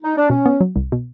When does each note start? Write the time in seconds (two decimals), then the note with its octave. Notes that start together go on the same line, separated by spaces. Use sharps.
0.03 D#4
0.17 D4
0.30 B2 C#4
0.46 B3
0.61 F#3
0.76 C2
0.92 B2